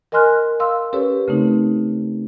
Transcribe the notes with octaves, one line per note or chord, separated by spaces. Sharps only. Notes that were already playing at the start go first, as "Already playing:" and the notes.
A#4 D#5 G#5 C6 F6 F#6
F5 C6 E6
C#4 G4 A4 B4 C#5
C#3 A3 C4 D#4